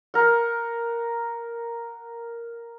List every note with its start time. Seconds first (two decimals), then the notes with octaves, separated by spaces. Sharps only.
0.14 A#4 F#5